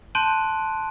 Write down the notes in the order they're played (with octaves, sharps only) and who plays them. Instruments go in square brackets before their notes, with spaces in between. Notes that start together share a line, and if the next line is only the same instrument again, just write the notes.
[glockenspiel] A5 C6 F#6 G6 D7 D#7